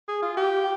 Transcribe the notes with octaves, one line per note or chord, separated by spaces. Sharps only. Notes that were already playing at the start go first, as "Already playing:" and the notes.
G#4
F4
G4